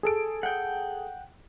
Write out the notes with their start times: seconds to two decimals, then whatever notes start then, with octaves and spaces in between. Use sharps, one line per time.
0.03 G#4 A4 D7
0.43 F#5 G5